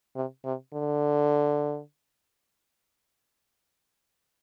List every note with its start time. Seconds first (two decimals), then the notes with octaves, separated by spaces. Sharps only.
0.15 C3
0.45 C3
0.74 D3